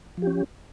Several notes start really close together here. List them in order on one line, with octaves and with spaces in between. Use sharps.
F3 G4 C#4